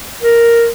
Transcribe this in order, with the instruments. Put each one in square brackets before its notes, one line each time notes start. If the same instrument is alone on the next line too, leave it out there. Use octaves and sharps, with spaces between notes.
[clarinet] A#4